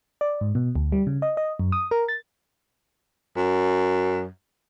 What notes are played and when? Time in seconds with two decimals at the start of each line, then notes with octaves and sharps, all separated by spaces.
0.21 D5
0.41 G#2
0.55 B2
0.76 D2
0.92 G3
1.07 C#3
1.22 D#5
1.37 D#5
1.59 F#2
1.72 D#6
1.91 A#4
2.08 A6
3.36 F#2